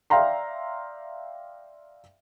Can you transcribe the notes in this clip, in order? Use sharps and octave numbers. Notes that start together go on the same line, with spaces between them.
D5 E5 F5 G5 A#5 C6